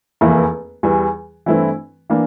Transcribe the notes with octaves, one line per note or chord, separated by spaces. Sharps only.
F1 E2 E3 A#3 E4
E2 E3 G3
G2 E3 A3 C4 E4
E3 A#3 D4